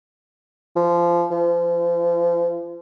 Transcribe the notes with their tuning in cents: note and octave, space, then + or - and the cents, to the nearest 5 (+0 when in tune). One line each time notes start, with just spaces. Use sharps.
F3 -20
F3 -35